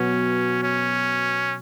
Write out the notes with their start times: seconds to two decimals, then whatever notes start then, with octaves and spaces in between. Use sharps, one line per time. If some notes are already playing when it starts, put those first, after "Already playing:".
Already playing: B2 F#3 B3 C#4 F#4
0.63 C#4